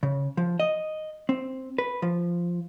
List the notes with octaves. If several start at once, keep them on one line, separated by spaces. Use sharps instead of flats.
C#3
F3
D#5
C4
B4
F3